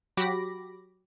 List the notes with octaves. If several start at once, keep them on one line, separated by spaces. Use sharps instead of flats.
F#3 F#4 G4 B5 D6 A#6